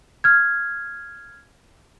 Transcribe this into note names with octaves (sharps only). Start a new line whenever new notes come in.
F6 G#6